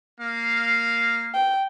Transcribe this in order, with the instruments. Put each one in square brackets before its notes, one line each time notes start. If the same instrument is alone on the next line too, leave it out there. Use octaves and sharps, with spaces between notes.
[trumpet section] A#3 F5
[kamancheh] G5